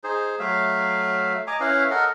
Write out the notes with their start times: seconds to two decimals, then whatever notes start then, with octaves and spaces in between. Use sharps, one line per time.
0.04 D#4 G#4 C5
0.39 F#3 A3 E5 F5
1.47 D#5 G#5 A#5 D6
1.60 C#4 E4 B4 F5
1.91 A4 A#4 D#5 F#5